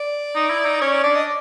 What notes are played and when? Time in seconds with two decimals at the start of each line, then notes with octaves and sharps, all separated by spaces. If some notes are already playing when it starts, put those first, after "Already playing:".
Already playing: D5
0.35 D#4
0.50 E4
0.66 D#4
0.81 C#4 C#5
0.92 D5
1.03 D4 D5
1.15 D#5